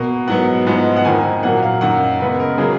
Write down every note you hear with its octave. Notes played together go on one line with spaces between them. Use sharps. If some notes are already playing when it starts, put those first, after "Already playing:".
Already playing: B2 A#3
G#2 F#3 B3 F#5
G#2 F3 G#3 B3
F#5
F2 D#3 A#3 G#5
A#2 F#3 A#3 F#5
F5
F#2 D#3 A#3 F#5
C#3 G#3 B3 B4
A#4
C#3 F#3 A#3 G#4